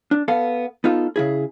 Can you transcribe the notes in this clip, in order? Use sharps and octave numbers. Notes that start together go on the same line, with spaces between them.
D4
B3 A4 F5
B3 D#4 F4 A4
C#3 E4 G#4